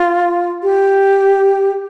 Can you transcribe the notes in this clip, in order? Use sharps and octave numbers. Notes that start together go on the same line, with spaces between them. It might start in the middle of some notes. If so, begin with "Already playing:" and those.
Already playing: F4
G4